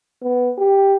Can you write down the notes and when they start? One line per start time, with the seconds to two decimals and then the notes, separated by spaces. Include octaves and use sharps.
0.22 B3
0.58 G4